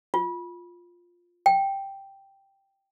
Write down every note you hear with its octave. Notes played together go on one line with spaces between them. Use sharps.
F4
G5